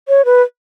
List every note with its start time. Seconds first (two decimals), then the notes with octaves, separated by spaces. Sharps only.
0.08 C#5
0.25 B4